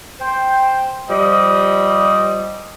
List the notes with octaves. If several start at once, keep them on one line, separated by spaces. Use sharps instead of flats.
C5 G5
F3 G3 D#5